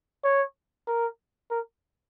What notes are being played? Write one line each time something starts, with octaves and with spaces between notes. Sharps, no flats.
C#5
A#4
A#4